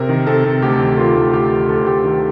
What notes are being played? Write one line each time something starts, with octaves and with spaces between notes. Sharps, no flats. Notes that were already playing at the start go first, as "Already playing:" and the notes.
Already playing: C3 A#4
D#3
C3 A4
C3
D2 G4
D#3
D#3 F4
D2
D2 G4
D#3
D2 A4
D2 G4
D#3